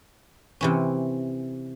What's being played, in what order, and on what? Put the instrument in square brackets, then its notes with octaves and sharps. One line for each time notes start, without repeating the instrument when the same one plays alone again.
[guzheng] C3 E3 C#4